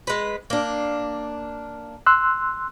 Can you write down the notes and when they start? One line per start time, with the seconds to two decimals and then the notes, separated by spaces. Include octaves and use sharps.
0.07 G#3 B4
0.50 A#3 D4
2.06 C6 E6 F#6